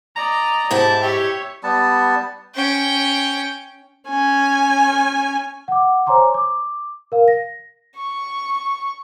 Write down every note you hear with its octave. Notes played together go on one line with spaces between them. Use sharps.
D5 D#5 A#5
G#2 E4 G4 A5
G4 C#5 E5
G3 B3 A5
C#4 G5
C#4 G#5
F#5 D6
C5 C#5 G#5 A#5 C6 D6
D6
A#4 F5
A#6
C#6